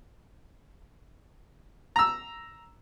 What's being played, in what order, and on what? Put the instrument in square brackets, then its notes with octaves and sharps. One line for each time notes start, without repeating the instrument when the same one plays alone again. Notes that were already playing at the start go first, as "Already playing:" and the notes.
[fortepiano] A#5 E6